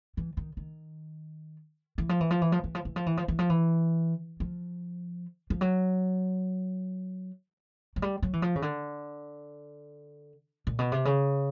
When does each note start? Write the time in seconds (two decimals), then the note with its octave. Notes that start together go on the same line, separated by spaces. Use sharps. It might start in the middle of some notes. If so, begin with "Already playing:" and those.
0.17 E3
0.37 D#3
0.57 D#3
1.98 E3
2.09 F3
2.20 E3
2.31 F3
2.41 E3
2.52 F3
2.64 E3
2.75 F3
2.85 E3
2.96 F3
3.06 E3
3.17 F3
3.28 E3
3.39 F3
3.50 E3
4.40 F3
5.50 F3
5.61 F#3
7.96 F#3
8.02 G3
8.22 F#3
8.33 E3
8.42 F3
8.56 C#3
8.62 D3
10.67 A#2
10.79 B2
10.92 C3
11.05 C#3